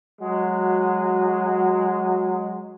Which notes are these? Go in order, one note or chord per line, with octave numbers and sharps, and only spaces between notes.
F#3 G#3 F#4